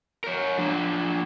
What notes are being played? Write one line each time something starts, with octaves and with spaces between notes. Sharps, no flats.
A#4 C#5
F3 D4